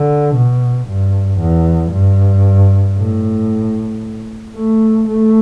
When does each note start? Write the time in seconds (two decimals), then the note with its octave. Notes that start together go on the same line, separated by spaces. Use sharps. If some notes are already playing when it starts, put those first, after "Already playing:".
Already playing: D3
0.35 B2
0.88 G2
1.40 E2
1.92 G2
2.97 A2
4.56 A3
5.08 A3